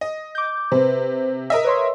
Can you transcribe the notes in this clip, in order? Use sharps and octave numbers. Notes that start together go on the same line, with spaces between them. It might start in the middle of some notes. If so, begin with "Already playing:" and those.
D#5
D6 G6
C3 B4 C5
A#4 D#5 E5
B4 C#5 C6